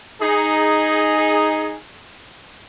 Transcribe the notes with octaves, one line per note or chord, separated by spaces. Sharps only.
D#4 G#4